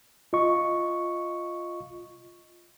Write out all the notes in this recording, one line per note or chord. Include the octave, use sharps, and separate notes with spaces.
F4 D#5 C#6